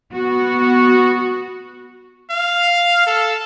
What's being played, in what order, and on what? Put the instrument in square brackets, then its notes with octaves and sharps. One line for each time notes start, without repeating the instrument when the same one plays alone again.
[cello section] B3 F#4
[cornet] F5
A4